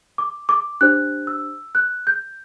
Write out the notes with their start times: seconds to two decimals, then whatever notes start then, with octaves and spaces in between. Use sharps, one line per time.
0.18 D6
0.49 D6
0.81 D4 G4 C5 F#6
1.27 E6
1.75 F#6
2.07 G6